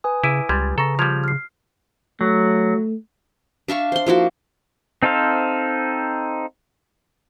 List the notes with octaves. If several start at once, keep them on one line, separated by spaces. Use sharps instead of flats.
B4 G#5 D#6
C#3 E4 D6 D7 D#7
C#2 G3 C6 G#6 A6
C#3 A4 A#5 C#6 A#6
F3 G3 G6 G#6 F7
F6 C7
F#3 A3
D4 E5 F5 C#6
C5 C6
F3 A#3 E4 F#4
C4 D#4 A4 C5 F5